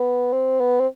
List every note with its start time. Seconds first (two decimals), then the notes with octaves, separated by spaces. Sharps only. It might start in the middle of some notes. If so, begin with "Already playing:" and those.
Already playing: B3
0.33 C4
0.60 B3
0.80 C4